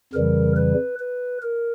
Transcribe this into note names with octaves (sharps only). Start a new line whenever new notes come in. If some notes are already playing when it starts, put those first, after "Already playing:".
F2 C#3 E3 G3 A#4
B4
B4
A#4